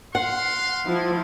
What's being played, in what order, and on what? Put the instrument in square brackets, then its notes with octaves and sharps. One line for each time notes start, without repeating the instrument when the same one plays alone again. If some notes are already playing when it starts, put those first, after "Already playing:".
[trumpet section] F5 C6 [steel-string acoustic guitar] F#5
[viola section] F3 E4